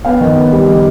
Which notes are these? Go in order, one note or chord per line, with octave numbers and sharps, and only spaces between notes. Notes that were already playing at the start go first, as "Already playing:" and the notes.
B3 F5 G5
D#3
B3
G3
D#3